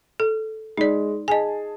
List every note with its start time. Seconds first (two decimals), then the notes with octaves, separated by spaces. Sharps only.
0.20 A4
0.77 G#3 D#4 D5
1.28 G#4 D#5 G#5 A5